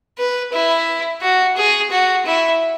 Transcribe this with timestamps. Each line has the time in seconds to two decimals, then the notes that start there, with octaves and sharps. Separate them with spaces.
0.18 B4
0.53 E4
1.21 F#4
1.56 G#4
1.90 F#4
2.26 E4